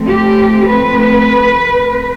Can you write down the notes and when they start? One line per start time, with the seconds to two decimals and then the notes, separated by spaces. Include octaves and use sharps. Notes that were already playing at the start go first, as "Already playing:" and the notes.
Already playing: F3 A3 C4
0.09 G4
0.69 B4